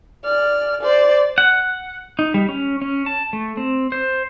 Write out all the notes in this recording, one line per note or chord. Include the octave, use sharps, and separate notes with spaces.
D5 F6
C5 D5
F#5
D#4
G3
C#4
C#4
A5
A3
C4
C5